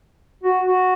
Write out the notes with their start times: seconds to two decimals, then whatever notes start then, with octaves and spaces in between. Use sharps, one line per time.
0.43 F#4
0.67 F#4